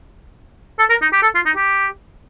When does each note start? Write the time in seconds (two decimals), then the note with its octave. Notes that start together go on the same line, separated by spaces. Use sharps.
0.79 A4
0.90 A#4
1.02 D#4
1.13 G4
1.23 A4
1.35 F4
1.46 D#4
1.57 G4